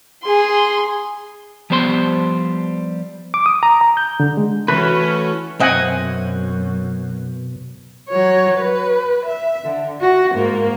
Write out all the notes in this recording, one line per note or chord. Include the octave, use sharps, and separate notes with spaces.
G#4 C6
F3 G3 B3 C5 A5 C6
D6
D#6
A#5
A#5
G6
D3
G#3
E3 A3 C#4 F#4 B4
F#2 B2 C4 D#5 E5 F#5 G#5
F#3 C#5
B4
E5
D3
F#4
G#2 A#3